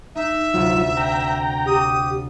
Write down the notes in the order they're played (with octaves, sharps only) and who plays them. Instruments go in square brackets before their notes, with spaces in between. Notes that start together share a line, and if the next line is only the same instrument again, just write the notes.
[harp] D#4 [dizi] E5
[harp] D2 C3 [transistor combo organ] F#3 F4
[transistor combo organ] G5 A#5
[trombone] G4 [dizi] D#6